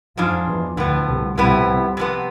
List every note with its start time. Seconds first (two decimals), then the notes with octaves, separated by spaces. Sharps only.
0.17 F2 G#2 F3 G#3 D4 F4
0.47 E2 E3
0.77 D2 A2 D3 F3 B3
1.08 C2 C3
1.37 C2 A2 C3 F3 B3 E4
1.97 C3 F3 B3